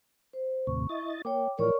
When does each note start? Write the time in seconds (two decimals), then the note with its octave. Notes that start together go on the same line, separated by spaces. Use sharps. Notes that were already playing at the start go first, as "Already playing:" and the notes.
0.33 C5
0.67 D#2 A2 C3 C#6
0.89 E4 D#5 A6
1.25 A#3 C#5 G5 D6
1.59 A2 E3 F3 A#4 C#5 D5 C#6